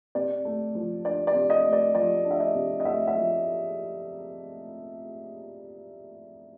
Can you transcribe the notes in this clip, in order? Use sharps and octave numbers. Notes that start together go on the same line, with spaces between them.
C3 D5
A3
F3
D4 D5
D5
C3
D#5
A3
D5
F3 D5
D4
E5
D#5
C3
D#5
A3 E5
E5
F3